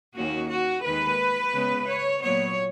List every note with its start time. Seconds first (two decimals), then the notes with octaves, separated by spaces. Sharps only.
0.15 D#2 D#3 A#3 C#4 F#4
0.50 F#4
0.84 D#2 D#3 G#3 B4
1.53 C#3 G#3 B3
1.86 C#5
2.21 A#2 F#3 B3 C#5